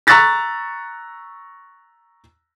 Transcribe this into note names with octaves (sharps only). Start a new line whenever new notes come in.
A#5 C#6 E6 F#6 A6 B6